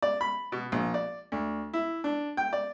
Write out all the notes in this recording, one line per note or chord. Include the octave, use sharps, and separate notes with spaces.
D5
B5
B2
A#1
D5
D2
E4
D4
G5
D5